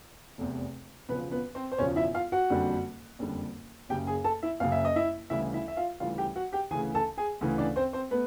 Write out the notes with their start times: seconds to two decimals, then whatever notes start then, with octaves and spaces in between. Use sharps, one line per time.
0.38 F1 E2 C3
1.09 E1 E2 C#3 F3 B3 B4
1.32 B3 B4
1.55 C4 C5
1.72 C5
1.78 E1 E2 C#3 F3 C#4 C#5
1.96 E4 E5
2.14 F4 F5
2.32 F#4 F#5
2.50 F#1 F2 D3 G3
3.19 F#1 F2 D3 G3
3.89 F#1 F#2 C#3 G4 G5
4.07 G#4 G#5
4.24 A4 A5
4.43 E4 E5
4.60 F#1 F#2 C#3 F5
4.72 E5
4.85 D#5
4.96 E4 E5
5.30 D2 C#3 E3 G3 E4 E5
5.54 E4 E5
5.68 E5
5.77 F4 F5
6.00 D2 C#3 E3 G3 F4 F5
6.18 G4 G5
6.36 F#4 F#5
6.53 G4 G5
6.71 D2 C#3 E3 G#4 G#5
6.95 A4 A5
7.17 G#4 G#5
7.41 D2 C#3 E3
7.58 D4 D5
7.76 C4 C5
7.93 C4 C5
8.11 A3 B3 B4